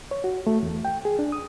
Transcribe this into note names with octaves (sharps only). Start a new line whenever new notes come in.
C#5
F#4
A3
E2
G5
G#4
D4
D#6